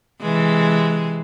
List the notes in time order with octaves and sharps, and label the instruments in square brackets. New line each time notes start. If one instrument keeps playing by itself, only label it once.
[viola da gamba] C3 E3 G#3